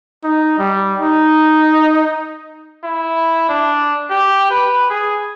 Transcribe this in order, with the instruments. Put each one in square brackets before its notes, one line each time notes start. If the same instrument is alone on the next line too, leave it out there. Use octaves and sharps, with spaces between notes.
[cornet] D#4
G3
D#4
[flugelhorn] E4
D4
G4
B4
G#4